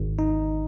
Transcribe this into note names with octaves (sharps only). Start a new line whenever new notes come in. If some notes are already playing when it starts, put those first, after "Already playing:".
Already playing: G#1
D#4